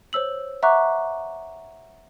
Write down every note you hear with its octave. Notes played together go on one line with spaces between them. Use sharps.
C5 C#5 E6 F#7
E5 F#5 A#5 C#6 D6 F#6